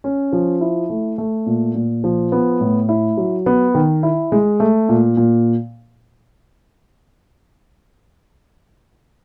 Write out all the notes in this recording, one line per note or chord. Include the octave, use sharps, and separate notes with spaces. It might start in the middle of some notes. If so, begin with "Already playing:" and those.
C#4
F3
E4
A3
A3
A#2
A#2
F3
B3
A2
E4
F#3
B3
D#3
E4
G#3
A3
A#2
A#2